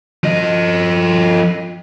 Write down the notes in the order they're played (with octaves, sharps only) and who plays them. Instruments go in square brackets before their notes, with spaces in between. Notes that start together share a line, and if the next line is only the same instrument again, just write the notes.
[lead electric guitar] F3 D#5